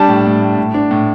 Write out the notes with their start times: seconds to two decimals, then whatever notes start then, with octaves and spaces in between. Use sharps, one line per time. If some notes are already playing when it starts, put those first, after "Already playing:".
Already playing: G3 D4 A5
0.08 A2
0.26 A2
0.42 A2
0.57 A2
0.74 D4
0.91 A2